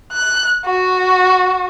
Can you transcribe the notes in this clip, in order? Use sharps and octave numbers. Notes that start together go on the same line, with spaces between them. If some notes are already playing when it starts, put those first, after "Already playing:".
F#6
F#4